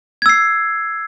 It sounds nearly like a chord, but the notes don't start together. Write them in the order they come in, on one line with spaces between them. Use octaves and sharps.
G#6 E6 C7